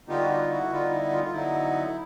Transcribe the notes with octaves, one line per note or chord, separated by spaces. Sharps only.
D3 G3 B3 D#4 F4 G4
F#4
F4
E4 F#4
D3 G3 B3 D#4 F4
E4
F4
F4
D3 F#3 B3 D#4 E4